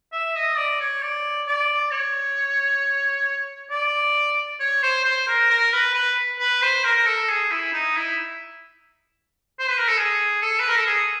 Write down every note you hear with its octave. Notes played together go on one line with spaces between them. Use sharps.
E5
D#5
D5
C#5
D5
D5
C#5
D5
C#5
C5
C5
A#4
A#4
B4
B4
B4
C5
A#4
A#4
A4
G#4
E4
D#4
E4
C5
B4
A#4
A4
G#4
A4
B4
A#4
A4
G#4